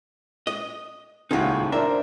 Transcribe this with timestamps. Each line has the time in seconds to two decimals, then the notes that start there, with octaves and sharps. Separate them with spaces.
0.47 D#5
1.31 D#1 C#2 A2 D#4 F4 F#4
1.72 D4 A#4 C5 E5